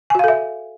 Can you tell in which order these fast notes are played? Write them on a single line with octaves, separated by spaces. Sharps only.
G#5 F#4 F5 A4 E5